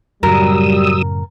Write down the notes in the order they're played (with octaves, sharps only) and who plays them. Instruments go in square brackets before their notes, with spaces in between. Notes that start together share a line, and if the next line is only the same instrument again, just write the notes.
[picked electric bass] F#2 A2 C#3 [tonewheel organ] F#3 D#6 E6 [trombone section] G3 [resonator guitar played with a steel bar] A#4